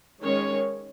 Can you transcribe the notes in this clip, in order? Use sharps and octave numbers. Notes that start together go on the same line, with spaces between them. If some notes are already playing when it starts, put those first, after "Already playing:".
D#3 G#3 C#4 C#5